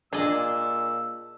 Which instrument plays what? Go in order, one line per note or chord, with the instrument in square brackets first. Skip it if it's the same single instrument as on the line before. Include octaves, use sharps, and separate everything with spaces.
[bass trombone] A#2 [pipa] D4 [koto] G#4 D#5 [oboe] E6